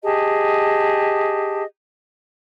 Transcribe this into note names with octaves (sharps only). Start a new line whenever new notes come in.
G4 G#4 D#5 A5